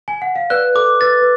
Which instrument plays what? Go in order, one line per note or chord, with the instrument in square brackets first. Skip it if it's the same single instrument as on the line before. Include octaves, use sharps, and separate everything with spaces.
[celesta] G#5
F#5
F5
[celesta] B4 D5 [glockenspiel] F#6
[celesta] A4 [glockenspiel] D6
[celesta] B4 [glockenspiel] A6
[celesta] B4